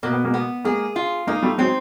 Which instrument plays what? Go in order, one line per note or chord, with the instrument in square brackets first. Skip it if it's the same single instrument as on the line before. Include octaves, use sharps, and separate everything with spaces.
[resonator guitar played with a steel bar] B2 [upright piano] A#3
[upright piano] B3
G#3 A#3
[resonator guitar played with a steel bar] B3
[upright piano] G#3 A#3 [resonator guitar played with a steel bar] G#4
[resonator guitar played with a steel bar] F4
[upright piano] G#3 A#3 [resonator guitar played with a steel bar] D#4
[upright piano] G3 A3
[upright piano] F#3 G#3 [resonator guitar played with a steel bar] C4